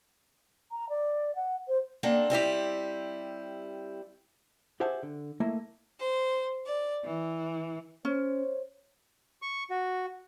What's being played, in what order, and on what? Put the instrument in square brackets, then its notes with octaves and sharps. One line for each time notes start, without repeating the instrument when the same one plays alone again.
[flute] A#5
D5
F#5
C5
[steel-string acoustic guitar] A#3 C4 D4 A4 F#5
G3 C4 E4 G4
[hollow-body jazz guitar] G4 G#4 C5 E5 F#5 A5
D3
A3 A#3 E4 D#5
[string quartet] C5
D5
E3
[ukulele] C#4 [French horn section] C5 C#5
[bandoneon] C#6
F#4